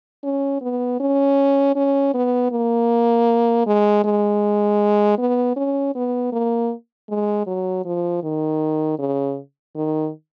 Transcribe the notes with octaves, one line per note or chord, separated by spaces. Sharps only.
C#4
B3
C#4
C#4
B3
A#3
G#3
G#3
B3
C#4
B3
A#3
G#3
F#3
F3
D#3
C#3
D#3